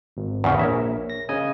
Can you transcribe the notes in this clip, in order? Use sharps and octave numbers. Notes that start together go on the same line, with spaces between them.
G#1
E2 C#3
A#1 A#4 C#5 E5
A#6
C#3 D#5 G#5